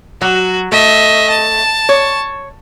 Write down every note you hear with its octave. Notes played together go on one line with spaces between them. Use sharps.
F#3 F#4
A3 D#5 E5
A5
C#5